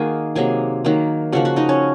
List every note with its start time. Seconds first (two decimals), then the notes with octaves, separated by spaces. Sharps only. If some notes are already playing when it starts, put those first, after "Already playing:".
Already playing: D#3 A#3 D#4 F#4 G#4 F#5 G#5
0.35 C3 F#3 A#3 G#4 G#5
0.85 D#3 F#3 A#3
1.32 C#3 F3 A#3 F#4 F#5
1.45 F#4 F#5
1.56 D#4 D#5
1.69 C#4 C#5